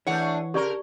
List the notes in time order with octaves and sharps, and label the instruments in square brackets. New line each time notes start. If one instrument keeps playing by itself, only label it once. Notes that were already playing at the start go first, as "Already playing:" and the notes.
[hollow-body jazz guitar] E3 [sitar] A3 D4 G#4 [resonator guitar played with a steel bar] C#5 F#5
[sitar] C#3 A#4 [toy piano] G4 D5 C#6